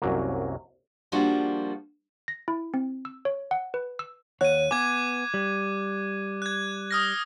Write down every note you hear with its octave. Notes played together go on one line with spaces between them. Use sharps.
C2 F#2 F#3 A#3
F3 G3 A#3 D4 F4 F#4
A#6
E4
C4
E6
C#5
F#5
B4
E6
D#2 C#5 F#5 F#6 D#7
B3 G#5 D6 G#6
G3
F#6 G#6
D#6 F6 A#6